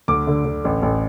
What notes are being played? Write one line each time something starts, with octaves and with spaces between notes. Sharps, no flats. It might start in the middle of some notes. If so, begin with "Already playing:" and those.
D2 D6
D3
D3
A1
A1